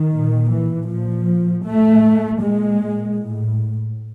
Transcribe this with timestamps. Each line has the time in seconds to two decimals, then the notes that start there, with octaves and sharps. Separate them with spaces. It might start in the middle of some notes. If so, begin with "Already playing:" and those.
Already playing: D#3
0.13 A#2
0.52 E3
0.89 A#2 F3
1.65 A2 A3
2.40 A#2 G#3
3.16 A2